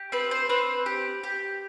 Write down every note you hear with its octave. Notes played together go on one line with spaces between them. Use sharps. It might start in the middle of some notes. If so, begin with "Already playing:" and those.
Already playing: G4
C4 B4
C5
C4 B4
G4
G4